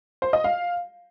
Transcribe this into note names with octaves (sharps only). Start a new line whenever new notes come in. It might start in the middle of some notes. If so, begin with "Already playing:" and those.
C5
D#5
F5